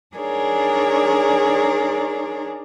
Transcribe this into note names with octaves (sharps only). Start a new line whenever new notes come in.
D4 D#4 G#4 A#4 C#5 D5